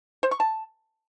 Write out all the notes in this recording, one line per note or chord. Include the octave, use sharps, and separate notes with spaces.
C5
C#6
A5